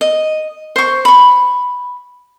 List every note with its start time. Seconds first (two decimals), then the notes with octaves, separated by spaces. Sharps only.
0.01 D#5
0.76 C5 C#6
1.05 B5 C#6